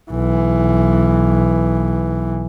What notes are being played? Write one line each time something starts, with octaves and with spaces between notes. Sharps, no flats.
B1 E3